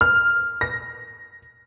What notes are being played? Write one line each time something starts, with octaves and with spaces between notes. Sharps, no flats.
F6
A#6